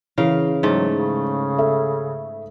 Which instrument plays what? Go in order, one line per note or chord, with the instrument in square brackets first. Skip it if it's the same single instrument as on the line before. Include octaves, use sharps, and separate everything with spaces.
[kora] C#3 A#4 F5 [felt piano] E3
[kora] G#2 A3 [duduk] F#3
[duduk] C#3
[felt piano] A4 E5